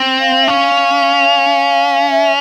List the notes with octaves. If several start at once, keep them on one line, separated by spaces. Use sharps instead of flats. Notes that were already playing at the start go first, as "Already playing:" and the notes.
Already playing: C4
F5
E5
C#4 F5
E5